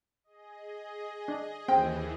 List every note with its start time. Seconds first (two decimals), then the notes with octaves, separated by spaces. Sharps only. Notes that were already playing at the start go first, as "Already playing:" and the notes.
0.24 G#4 D#5
1.28 D4
1.68 D#2 E3 C4 G5